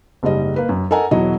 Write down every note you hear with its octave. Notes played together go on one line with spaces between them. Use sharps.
F#1 G#2 G3 D#5
A#3 B4
F#2
A4 A#4 D#5 F#5 G#5 A#5
E1 F#3 E4 F#4 D#5